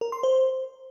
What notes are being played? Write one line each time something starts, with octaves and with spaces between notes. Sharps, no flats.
A#4
C6
C5